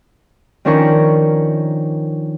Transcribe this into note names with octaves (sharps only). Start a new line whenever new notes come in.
D#3 F3 C#4 D4 A#4 C#6